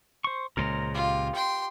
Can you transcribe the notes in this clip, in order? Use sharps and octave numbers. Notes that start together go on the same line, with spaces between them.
C5 C#6
C#2 A#2 A#4 C5 A#5
F4 G4
G5 C6